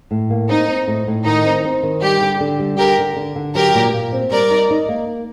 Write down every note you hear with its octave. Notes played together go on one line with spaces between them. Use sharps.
A2
A#3
C4 D#4
C4
A2
A2
D#3 D#4
C4
C4
D#3
G3 G4
D3
D3
G3
D3 G4 A#4
D3
D3
D3
F#3 G4 A#4
A#2
A#2
C4
G3 A#4 D5
D#4
D#4
A#3